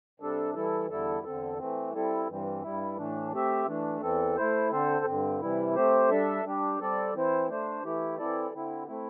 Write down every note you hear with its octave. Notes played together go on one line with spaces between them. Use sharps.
C3 G3 D4 A4
E3 G3 E4 A4
E2 D3 G3 E4 A4
E2 D3 C4 A4
E3 A3 C4
G3 C4 E4 A4
G2 E3 G3 C4
G2 G3 E4
A2 E3 A3 D4
A3 C4 G4 E5
E3 A3 D4
E2 E3 C4 A4
A3 E4 C5
D3 C4 A4 C5
G2 D3 C4
C3 E3 G3 E4
A3 C4 G4 C5
G3 D4 A4 E5
G3 D4 G4
G3 C4 A4 D5
E3 C4 E4 C5
A3 D4 C5
E3 A3 E4 G4
E3 C4 E4 A4 D5
D3 C4 E4
A3 C4 E4